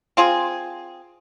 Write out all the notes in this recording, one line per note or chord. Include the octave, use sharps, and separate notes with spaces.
C4 F4 G#4